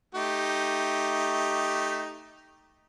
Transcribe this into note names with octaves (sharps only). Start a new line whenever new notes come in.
A3 D#4 G4